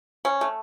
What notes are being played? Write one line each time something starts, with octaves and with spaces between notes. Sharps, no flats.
C#4
A3